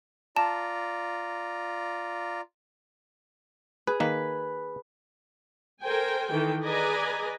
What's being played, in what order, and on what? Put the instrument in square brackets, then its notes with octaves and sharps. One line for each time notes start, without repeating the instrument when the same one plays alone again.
[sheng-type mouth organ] F4 D5 A#5 [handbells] A5
[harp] G#4 [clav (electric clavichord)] B4
[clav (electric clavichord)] D#3 A#3 [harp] B4
[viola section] A4 A#4 C5 G5 G#5
D#3 E3 A4 G5
G#4 B4 D5 D#5 G#5 A#5